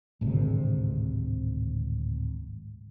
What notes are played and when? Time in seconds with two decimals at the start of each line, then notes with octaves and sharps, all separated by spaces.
0.21 D1 G#1 D2 C3